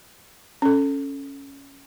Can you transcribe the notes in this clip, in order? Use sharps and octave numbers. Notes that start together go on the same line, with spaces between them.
C#4 A4